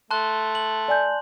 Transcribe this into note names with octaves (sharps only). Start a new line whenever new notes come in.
A3 A5 C6 F#6
F#7
D5 G#5 G6